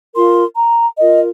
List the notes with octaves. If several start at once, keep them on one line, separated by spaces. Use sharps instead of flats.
F4 A#4 C6
A#5
F4 A#4 D#5